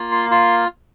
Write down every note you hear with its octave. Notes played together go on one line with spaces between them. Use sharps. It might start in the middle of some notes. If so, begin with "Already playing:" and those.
Already playing: A#3 F4
C6
F4 C6